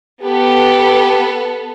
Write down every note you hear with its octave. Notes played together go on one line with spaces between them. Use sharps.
B3 G4 A4